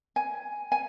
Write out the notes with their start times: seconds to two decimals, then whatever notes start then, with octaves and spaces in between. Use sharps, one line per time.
0.16 G#5
0.72 G#5